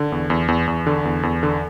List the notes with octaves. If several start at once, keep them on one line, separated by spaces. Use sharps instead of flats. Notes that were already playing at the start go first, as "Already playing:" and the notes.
Already playing: D3
E2
E2
E2
E2
D3
E2
E2
D3